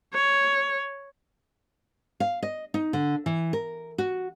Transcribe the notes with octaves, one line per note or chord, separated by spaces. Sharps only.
C#5
F5
D#5
D#4
D3
E3
A#4
F#4